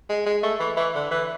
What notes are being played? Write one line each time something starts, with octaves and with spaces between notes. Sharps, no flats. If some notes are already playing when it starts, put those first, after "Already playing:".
G#3
G#3
A3
E3
E3
D3
E3